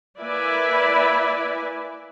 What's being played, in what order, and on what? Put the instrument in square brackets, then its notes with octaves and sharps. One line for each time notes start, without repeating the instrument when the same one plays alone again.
[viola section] A#3 E4 B4 D5 E5 G#5